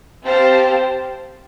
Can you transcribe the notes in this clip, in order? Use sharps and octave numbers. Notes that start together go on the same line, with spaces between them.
C4 G4 C5 F5 A5